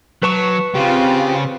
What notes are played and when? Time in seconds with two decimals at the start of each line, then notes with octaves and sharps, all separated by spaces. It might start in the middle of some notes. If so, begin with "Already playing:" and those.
0.23 F#3 B4 A5 C#6
0.75 C#3 C4 F4 G4